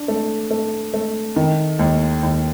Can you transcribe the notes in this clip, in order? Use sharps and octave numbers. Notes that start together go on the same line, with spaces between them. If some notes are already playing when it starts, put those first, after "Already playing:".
Already playing: D4
A3
A3
A3
D#3
D#2
D#2